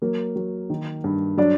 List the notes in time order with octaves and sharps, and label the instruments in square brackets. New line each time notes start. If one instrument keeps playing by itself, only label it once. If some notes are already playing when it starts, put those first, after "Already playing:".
[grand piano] F#3 A#3 A#4
F#3
D#3
G2
F#3 D4 D5